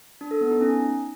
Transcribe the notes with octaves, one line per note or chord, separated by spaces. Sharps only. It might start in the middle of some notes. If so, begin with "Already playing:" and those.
D4
A4
B3
D#4
C#4